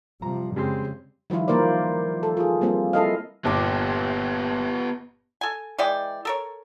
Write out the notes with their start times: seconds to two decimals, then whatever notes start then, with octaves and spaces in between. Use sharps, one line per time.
0.22 C3 F3 G3 A#5
0.56 F2 C#3 G3 G#3 C4
1.30 D#3 F3 G3 E4 F4
1.48 E3 A#3 A#4 C5 D5
2.23 A4
2.37 F4 G#4
2.61 G3 A#3 C4 F4
2.93 E4 A4 D#5 F5
3.45 G1 A#2 B3 G4 D6
5.41 A4 G#5
5.78 E3 G#3 D5 G5
6.25 A4 A#4 C#5